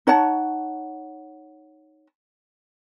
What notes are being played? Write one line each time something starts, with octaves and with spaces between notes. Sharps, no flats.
D#4 C#5 F#5 A5